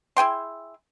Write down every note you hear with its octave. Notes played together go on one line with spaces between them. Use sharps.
E4 G#4 G5 C6